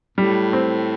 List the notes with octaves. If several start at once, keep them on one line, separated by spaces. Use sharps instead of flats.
A2 G3
C4